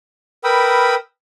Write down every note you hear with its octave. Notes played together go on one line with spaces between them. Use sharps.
A#4 B4 G5 B5 D#6 E6